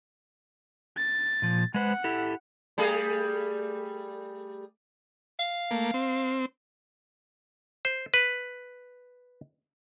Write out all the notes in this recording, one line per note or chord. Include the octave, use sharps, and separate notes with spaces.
A6
A#2 F3
G#3 B4 C5 F#5
E4 G4 A4
G3 A3 G#4
F5
A3 A#3
C4
C5
B4